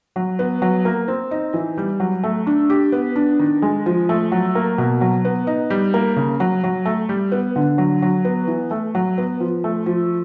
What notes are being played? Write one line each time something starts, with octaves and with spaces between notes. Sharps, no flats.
F#3
B3
F#3
A#3
C4
D#4
E3
G3
F#3
A3
D4
G4
B3
D4
D#3
G#3
F3
A3
F#3
A#3
B2
F#3
B3
D#4
G3
A#3
C#3
F#3
F#3
A3
G3
B3
D3
F#3
F#3
B3
E3
A3
F#3
B3
F3
A3
F3